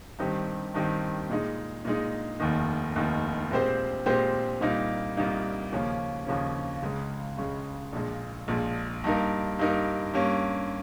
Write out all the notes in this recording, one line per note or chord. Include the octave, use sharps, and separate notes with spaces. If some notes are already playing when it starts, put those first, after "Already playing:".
G2 D#3 G3 C4 G4
G2 D#3 G3 C4 G4
A#2 G#3 D#4
A#2 G#3 D#4
F1 D#2 D#3
F1 D#2 D#3
A#2 G#3 C4 G4 C5
A#2 G#3 C4 G4 C5
C2 A#2 G3 A#3 D#4
C2 A#2 G3 A#3 D#4
D#2 C#3 F3 A#3 C#4
D#2 C#3 F3 A#3 C#4
C#2 C#3 G#3
C#2 C#3 G#3
A#1 A#2 G#3
A#1 A#2 G#3
G2 G3 A#3 D#4 A#4
G2 G3 A#3 D#4 A#4
G2 G3 A#3 C#4